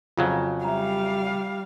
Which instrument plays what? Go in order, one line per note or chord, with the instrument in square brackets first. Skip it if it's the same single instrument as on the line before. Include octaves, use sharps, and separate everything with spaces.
[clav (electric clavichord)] F2 C#3 F#3 [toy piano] F4 F5 G#5
[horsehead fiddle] G3 F5 [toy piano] E5 A#5